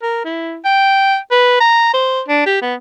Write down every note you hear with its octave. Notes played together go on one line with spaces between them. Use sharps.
A#4
E4
G5
B4
A#5
C5
D4
G4
B3